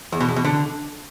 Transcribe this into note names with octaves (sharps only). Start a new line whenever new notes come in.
E2
B2
E2
B2
D3